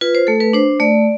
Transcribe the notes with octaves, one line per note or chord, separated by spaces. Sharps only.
F4 B4
C5
A3 A4
B4
D4 C5
A3 D5